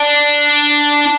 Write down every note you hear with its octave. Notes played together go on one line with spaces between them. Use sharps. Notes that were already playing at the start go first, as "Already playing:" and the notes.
Already playing: D4